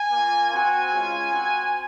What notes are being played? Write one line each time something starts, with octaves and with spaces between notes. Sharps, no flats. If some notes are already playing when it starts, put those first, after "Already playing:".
Already playing: G#5
A#3 F4
C4 F#4 G#5
G#3 C#4 F4
C4 F#4